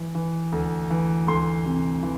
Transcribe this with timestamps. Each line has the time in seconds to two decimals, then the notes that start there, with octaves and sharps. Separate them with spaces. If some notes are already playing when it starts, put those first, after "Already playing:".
Already playing: E3
0.15 E3
0.52 D2
0.90 E3
1.27 D2 C6
1.65 C3
2.03 E3